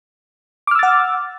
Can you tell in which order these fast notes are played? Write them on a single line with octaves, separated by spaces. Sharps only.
D6 F6 E6 A6 F#5